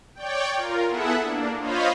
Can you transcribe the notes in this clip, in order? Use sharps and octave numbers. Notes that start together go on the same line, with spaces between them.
C#5 D5 G5
F4 A#4
B3 E4 G#4 A4 E5 F#5
A#3 D4
F4 C5 C#5 D#5 F5 B5